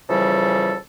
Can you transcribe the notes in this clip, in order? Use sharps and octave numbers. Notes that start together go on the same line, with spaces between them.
C#3 E3 F3 G3 A4